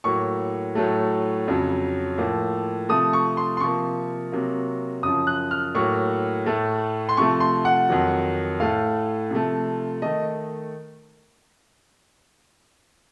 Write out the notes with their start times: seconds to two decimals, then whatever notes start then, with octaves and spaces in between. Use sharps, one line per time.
0.04 A2 F#3 A#3 C#6
0.75 A2 F#3 A3
1.47 F2 C#3 F#3
2.18 A2 F3 A#3
2.89 C3 F3 A3 D#6
3.13 C#6
3.37 C6
3.57 C6
3.60 C3 F3 A#3 C#6
4.32 C3 F#3 A#3
5.03 F#2 C#3 F3 D#6
5.27 F#6
5.51 F6
5.75 A2 F#3 A#3 C#6
6.46 A2 A3
7.09 C6
7.17 C3 F3 A3 C#6
7.40 C6
7.65 F#5
7.89 F2 D#3 F#3
8.60 A2 A3 F5
9.31 C3 F3 A3
10.02 D#3 A3 D#5